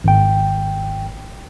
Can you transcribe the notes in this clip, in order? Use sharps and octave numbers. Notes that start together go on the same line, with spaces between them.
G#1 G5